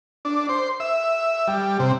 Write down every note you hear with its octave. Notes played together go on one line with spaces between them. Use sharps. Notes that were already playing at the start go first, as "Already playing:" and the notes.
D4
C5
E5
G3
C3